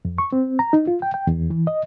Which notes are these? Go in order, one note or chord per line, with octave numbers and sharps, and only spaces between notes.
F2
C#6
C4
A#5
D#4
F4
G5
G5
E2
E3
D#5